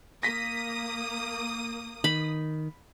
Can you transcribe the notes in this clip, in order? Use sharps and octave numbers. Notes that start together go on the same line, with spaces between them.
A#3 D#6 A#6 B6
D#3 B5